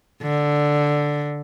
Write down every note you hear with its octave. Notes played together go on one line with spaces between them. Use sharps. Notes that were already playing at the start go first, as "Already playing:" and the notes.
D3